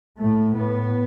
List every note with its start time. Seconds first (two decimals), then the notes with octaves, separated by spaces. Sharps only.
0.20 A2 A3
0.54 A2 B3